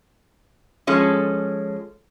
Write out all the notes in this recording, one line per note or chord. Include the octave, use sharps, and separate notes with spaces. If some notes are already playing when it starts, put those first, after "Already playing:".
F3 G#3 C#4 A4